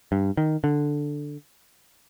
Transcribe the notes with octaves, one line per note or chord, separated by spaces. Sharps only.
G2
D#3
D3